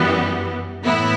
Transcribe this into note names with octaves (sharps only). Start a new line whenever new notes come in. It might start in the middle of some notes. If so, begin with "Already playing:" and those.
Already playing: F#2 E3 G3 B3
A2 E3 B3 E4